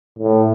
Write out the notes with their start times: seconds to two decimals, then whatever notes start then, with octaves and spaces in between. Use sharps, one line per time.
0.19 A2